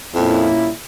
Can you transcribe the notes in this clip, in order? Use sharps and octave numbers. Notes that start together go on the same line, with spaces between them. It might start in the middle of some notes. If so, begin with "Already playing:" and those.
F2 A#2 G3 A#3 C#4 E4